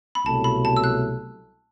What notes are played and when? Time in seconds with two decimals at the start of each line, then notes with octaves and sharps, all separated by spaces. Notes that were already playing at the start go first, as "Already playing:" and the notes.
0.15 B5
0.26 C2 B2 F#3 A3 A5
0.44 B5
0.65 A5
0.77 E6
0.84 F#6